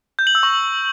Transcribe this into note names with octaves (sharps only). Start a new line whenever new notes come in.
G6
F#7
E6
C#6